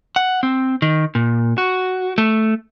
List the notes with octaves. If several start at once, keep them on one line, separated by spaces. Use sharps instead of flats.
F#5
C4
D#3
A#2
F#4
A3